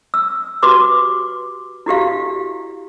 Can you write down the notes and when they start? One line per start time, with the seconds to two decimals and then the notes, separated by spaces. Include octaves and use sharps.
0.14 E6
0.62 F#4 G4 B4 C6 D6
1.86 E4 F#4 G4 F5